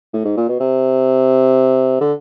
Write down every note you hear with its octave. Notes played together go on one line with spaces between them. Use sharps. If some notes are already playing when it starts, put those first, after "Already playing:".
A2
G#2
A#2
B2
C3
D3